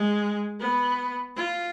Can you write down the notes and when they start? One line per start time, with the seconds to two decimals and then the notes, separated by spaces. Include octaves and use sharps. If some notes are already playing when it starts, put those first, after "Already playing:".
Already playing: G#3
0.59 B3
1.36 F4